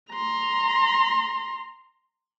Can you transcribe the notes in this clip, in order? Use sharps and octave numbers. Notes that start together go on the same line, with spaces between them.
A#5 C6